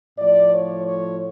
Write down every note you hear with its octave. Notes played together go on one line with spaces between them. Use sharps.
A2 F3 A3 D5
C#5
C#5